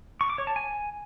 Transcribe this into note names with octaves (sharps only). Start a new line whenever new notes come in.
C#6
D6
C#5
A5
G#5